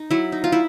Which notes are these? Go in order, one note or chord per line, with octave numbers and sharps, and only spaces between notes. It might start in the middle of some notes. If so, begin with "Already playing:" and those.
Already playing: D#4
F#3 E4
D#4
F4
E4